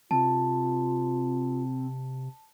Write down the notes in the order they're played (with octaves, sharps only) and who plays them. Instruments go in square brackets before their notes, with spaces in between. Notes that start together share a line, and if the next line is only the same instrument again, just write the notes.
[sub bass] C3 [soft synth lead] C4 [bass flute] F4 [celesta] A5